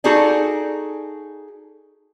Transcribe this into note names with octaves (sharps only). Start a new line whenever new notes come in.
D#4 F#4 G#4 A4 D5